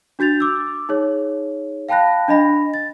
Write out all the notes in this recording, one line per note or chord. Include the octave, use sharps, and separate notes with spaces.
D4 F#4 G6 A6 F7
D6 E6
D#4 G#4 C#5
F5 G5 A5 B5 F#6 A#6
D4 D#5 B5 A#6
A6